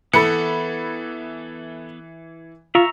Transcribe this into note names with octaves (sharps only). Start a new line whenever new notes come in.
E3 B3 A4 B5 C#7
F4 E5 A#5 C#6